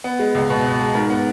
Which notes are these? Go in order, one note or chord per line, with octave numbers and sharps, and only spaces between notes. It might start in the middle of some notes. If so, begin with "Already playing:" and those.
B3
G#3
C#2
B2
B3
G#3
G#2 A#4
B3